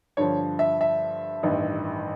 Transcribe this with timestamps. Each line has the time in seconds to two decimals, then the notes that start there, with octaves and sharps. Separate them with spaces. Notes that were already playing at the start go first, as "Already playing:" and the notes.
0.17 G2 D3 F3 C#5
0.59 E5
0.81 E5
1.43 A1 G2 D#3